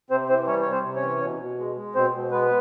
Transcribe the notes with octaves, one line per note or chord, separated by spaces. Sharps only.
C3 C4 C5
E3 C4 C5
G3 C#4 C#5
C3 C#5
C4 C5
C3
C#4 C#5
E3
B2
B2
G#3
G#3
B2 C4 C5
B2
G#3 B3 B4